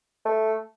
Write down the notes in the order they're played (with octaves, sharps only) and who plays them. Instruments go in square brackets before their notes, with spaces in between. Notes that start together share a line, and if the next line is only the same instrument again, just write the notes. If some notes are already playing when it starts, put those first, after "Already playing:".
[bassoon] A3